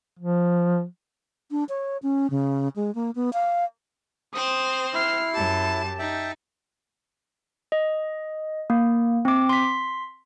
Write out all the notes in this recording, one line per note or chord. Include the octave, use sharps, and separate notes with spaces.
F3
D4
C#5
C#4
C#3
G#3
A#3
B3
F5
C4 C5 D#6
E4 F6 C7
F#2 G4 A5
D#4 E5 G5 A5
D#5
A#3
C4 D6
C6 B6